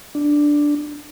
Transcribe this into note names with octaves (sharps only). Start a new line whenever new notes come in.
D4